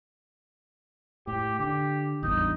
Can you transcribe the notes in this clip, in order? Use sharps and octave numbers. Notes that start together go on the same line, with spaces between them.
A2 G4
D3 G4
A1 E2 G2 D#4